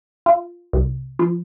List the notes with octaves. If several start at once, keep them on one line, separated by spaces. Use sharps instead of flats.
F4
C2
F3